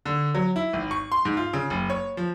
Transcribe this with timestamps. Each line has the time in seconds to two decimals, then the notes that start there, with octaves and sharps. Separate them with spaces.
0.06 D3
0.35 F#3
0.56 E4
0.73 G#1
0.91 C#6
1.12 C6
1.25 G#2
1.37 F4
1.53 C#3
1.70 F#1
1.90 C#5
2.17 F3